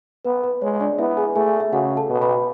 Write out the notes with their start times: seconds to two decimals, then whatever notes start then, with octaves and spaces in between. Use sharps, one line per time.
0.25 B3 B4
0.44 B4
0.62 G#3 C#5
0.80 D4 D5
0.98 B3 E4 E5
1.17 G#4 G#5
1.35 A3 G#4 G#5
1.60 E5
1.72 C#3 F#4 F#5
1.97 A4 A5
2.09 B2
2.22 B4 B5